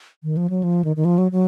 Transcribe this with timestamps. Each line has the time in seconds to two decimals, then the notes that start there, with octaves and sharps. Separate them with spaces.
0.23 D#3
0.37 F3
0.50 F#3
0.63 F3
0.85 D#3
0.96 D#3
1.05 F3
1.18 F#3
1.32 F#3